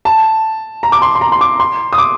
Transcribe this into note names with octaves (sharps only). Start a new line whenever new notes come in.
A5
A#5
D6
C6
C6
A#5
C6
D6
C6
D#6
D6